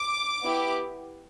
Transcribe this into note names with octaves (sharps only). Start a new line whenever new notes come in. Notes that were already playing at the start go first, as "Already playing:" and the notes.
Already playing: D6
B3 E4 G4